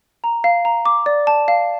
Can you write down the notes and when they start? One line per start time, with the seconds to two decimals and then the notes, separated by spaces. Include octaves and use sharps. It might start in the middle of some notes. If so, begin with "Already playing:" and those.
0.24 A#5
0.44 F5
0.65 A#5
0.85 D6
1.06 D5
1.27 A5
1.48 F5